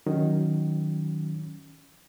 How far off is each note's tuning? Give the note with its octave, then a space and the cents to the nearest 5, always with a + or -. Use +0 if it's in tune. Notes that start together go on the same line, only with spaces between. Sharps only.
D#3 +0 F#3 +0 C#4 +5